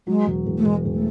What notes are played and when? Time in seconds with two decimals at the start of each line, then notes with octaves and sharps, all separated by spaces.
0.07 F#3 G#3
0.26 E1
0.46 E1
0.58 A3
0.65 E1 G#3
0.85 E1
0.94 A3